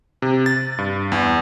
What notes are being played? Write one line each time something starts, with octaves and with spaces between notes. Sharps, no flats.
C3
A6
G2
E2